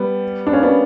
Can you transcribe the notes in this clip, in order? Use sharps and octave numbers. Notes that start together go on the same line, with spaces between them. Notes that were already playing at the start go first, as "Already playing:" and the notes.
Already playing: G3 B3
D4
A#3 C#4
B3 D4